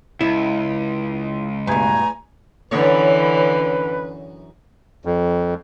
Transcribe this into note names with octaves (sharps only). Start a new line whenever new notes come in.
C#2 E4
E2 G2 B2 A3 G#5 A#5
F#2 A#2 D3 E3 B4 C#5
F2